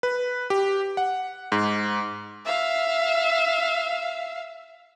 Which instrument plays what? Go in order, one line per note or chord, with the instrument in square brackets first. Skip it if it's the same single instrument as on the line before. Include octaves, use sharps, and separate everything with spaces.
[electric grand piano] B4
G4
F#5
G#2
[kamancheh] E5 F5